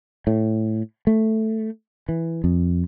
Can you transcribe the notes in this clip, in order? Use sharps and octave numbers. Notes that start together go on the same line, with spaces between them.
A2
A3
E3
F2